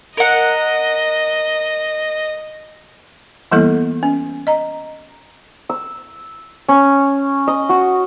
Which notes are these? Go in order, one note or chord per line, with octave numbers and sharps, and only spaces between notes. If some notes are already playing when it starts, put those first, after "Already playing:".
A#4 D#5 F#5
E3 G3 A#3 B3 E4 A4
C#4
D#5 A#5
E6
C#4
D#5
F#4